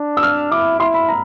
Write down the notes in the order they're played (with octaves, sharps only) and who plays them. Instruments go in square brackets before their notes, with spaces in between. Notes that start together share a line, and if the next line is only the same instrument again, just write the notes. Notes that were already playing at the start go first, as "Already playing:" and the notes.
Already playing: [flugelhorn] D4
[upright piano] E6
F6
[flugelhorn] E4 [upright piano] D6
[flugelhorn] E4 [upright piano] C6
[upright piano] B5
A#5